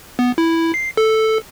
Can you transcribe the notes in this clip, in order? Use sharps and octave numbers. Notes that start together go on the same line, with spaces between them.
B3
E4
C7
A4